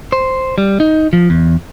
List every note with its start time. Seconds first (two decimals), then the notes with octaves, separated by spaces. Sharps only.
0.12 C5
0.58 G3
0.80 D#4
1.13 F3
1.30 E2